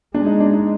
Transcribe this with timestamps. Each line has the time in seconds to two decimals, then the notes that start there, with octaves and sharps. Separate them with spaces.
0.14 G#3 D4
0.26 D#4
0.40 D4
0.53 D#4